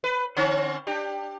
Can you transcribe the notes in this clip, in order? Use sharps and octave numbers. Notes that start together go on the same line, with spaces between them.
B4
D3 C4 C#4
D4 G4